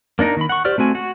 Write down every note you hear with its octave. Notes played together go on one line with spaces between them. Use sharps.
A#3 D4 D#4 A#4
D#3 B5
F#5 C#6
G4 C5 D5 F6
A3 C4 F#4 G#5
F#4